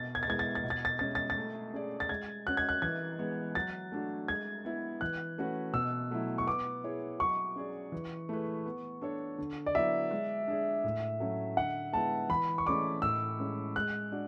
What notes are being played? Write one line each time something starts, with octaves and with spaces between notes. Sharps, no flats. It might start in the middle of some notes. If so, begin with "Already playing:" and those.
Already playing: B2 A6
G#6
A6
G#3 B3 E4 G#6
A6
A6
B2
A6
A6
G#3 C#4 A6
A6
A6
A3
C#4 G#4 D5
A6
G#3 G#6
C#4 F#4 F#6
G#6
F#6
E3 G#6
G#3 B3
F#3 A6
A3 D4 F#4
G#3 G#6
B3 E4 B4
E3 F#6
A3 C#4 F#4 B4
B2 E6
F#3 A3 E4
C#6
B3 D6
E4 G#4 C#5
F#3 C#6
C#4 G#4 D5
E3
A3 E4 G#4 B4
B3
D4 A4 C#5
D3
D5
F#3 B3 E4 E5
G#3
D4 G#4 D5
A2
F#3 A3 C#4
D3 F#5
G#3 B3 E4 A5
E3 B5
C#6
A3 C#4 G#4 D5 D6
A2 E6
G#3 C#4
G#3 F#6
D4 F#4 D5